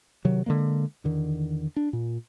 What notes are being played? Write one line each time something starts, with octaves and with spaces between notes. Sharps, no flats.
C3 D#3 F#3
D3 E3 G#3 A#3
E2 D3 D#3
D4
A#2